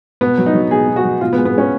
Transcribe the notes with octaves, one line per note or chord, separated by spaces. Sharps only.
B2 B3
F#3
D#4
F#3
B2 G#4
B2
F#4
F#3
B2 F4
B3
G#3
B3
G#3 C#4